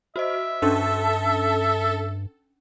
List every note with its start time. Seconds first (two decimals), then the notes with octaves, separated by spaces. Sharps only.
0.16 F#4 C5 D#5 E5
0.62 G2 C#4 D4 A4